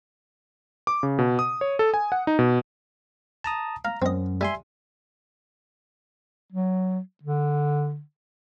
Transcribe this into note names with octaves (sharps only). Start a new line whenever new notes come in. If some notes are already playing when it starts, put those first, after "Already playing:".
D6
C#3
B2
D#6
C#5
A4
G#5
F#5
D#4
B2
A5 A#5 D#6
F5 A#5
F#2 C4 D#5
G3 E5 G#5 C6
F#3
D3